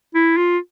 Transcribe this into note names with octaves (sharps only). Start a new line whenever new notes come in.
E4
F4